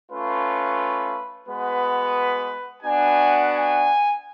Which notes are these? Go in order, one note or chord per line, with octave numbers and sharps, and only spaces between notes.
A3 C#4 F4 B4
G#3 B3 F#4 B4
B3 D4 F#4 G#5
G#5